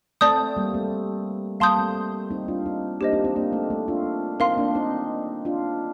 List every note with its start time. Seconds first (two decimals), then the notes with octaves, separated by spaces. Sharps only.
0.21 A3 C4 D5 A5 D#6 G6
0.56 G3 A#3
0.74 A3 C4
1.60 G3 A#3 F5 A5 C6 D#6 G6
1.78 A3 C4
2.30 C4 D#4
2.48 D4 F4
2.66 C4 D#4
3.01 A#3 D4 G4 C5 D#5
3.12 C4 D#4
3.24 C4 D#4
3.36 A#3 D4
3.53 A3 C4
3.70 A3
3.88 D4 F4
4.40 C4 D#4 A#4 F5 C6
4.57 A#3 D4
4.75 C4 D#4
5.45 D4 F4